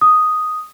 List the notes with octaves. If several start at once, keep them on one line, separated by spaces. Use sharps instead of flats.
D#6